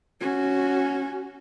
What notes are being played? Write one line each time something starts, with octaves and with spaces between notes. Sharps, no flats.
C#4 F#4